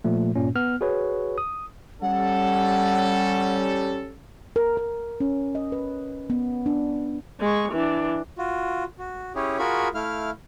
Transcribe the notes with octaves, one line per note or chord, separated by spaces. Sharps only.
A#2 F3 A3
G2 A#2 C#4
B3 F6
F#4 G#4 B4 C#5
D#6
G3 C#4 A4 F#5
A#4
A#4
C#4
D#5
B4
B3
D4
G#3 C#6
E3 D4
F4 F#4
F#4
C#4 E4 G4 G#4 C#5
F4 F#4 G#4 A#4 B5 C#6
A3 E4 F5 F6